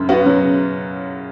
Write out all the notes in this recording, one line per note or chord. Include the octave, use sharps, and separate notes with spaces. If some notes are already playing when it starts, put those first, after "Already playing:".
Already playing: F#2 C#3
B3 F#4
F#3
C#3